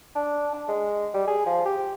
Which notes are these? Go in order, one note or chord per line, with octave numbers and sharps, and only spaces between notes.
D4
D4
G#3
G3
G#4
F3
G4